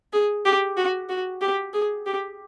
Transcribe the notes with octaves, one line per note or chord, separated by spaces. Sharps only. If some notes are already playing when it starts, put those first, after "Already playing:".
G#4
G4
F#4
F#4
G4
G#4
G4